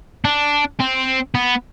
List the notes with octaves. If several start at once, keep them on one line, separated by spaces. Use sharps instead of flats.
D4
C4
B3